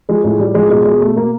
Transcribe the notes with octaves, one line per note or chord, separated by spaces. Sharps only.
F3 G#3
A2 G#3
A2 G3
F3 G#3
B2 G#3
B2 G#3
B2 A3
B2 A#3